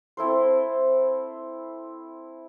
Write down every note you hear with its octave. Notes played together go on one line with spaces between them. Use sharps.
C4 E4 A4 C5